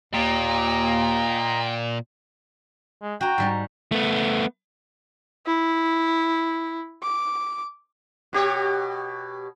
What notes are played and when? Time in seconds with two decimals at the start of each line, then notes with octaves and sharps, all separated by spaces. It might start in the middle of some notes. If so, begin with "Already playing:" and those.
0.14 D#2 A#2 D#5 G5 A#5
3.02 G#3
3.21 F#4 G5 A#5
3.38 G#2 G3 A#5
3.92 A3 B3
5.47 E4
7.03 D6
8.33 B2 G4 C#5